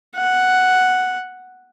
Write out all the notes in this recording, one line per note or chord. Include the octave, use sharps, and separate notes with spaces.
F#5